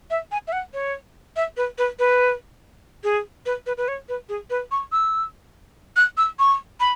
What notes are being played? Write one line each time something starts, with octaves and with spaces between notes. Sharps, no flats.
E5
G#5
E5
F#5
C#5
E5
B4
B4
B4
G#4
B4
B4
B4
C#5
B4
G#4
B4
C#6
E6
F#6
E6
C#6
B5